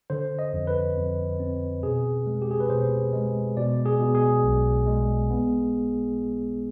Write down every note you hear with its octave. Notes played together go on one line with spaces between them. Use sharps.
D3 C5
D#5
F2
B4
F2
C4
B2 G#4
G#3
G4
G#4
B4
B2 C5
G#3
B2 D5
G#4
B2
G#4
B1
G#3
B3